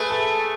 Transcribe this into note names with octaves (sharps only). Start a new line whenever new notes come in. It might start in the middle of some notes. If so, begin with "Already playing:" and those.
Already playing: A3 G#4 B4
A4